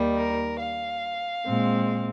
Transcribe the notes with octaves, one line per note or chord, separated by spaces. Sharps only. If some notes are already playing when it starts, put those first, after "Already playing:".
Already playing: D#2 D#3 G3
A#4
F5
A#2 G#3 C4